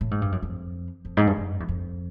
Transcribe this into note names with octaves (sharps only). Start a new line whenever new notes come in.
A2
G#2
G2
F#2
F2
F2
G#2
G2
F#2
E2
F2